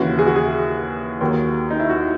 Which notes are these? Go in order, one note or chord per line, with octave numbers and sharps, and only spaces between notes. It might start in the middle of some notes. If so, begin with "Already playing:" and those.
Already playing: D#2 C#3 E3 F#4
G#4
F#4
G#4
D#2 D#3 F#3
D#4
E4
F#4